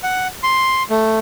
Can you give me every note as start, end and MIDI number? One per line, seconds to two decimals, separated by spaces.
0.03 0.28 78
0.43 0.83 84
0.90 1.19 57